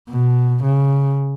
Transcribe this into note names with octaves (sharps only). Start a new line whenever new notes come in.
B2
C#3